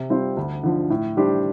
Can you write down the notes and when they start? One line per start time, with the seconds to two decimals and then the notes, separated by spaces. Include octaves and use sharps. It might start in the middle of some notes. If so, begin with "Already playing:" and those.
Already playing: C3
0.10 G3 C4 F4 C5
0.37 D2
0.63 D3 F3
0.90 A2
1.17 G3 D4 G4 C5